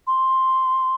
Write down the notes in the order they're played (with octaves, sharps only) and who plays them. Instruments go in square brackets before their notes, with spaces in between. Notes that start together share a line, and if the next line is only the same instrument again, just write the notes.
[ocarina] C6